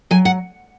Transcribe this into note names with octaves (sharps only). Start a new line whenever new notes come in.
F#3 G#5
F#5